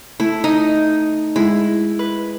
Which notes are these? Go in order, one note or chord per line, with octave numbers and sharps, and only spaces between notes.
A3 E4
D#4 D#5
G#3 E4
B4